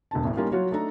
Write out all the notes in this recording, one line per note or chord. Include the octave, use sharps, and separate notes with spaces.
E1 D3 A5
A1 A2
G3 A#3 C#4 D#4 F4
F#3 F4 F#4 C#5
A3 D4 D#4 A4 A#5